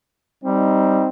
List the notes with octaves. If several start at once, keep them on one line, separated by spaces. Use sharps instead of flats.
G3 C4 D#4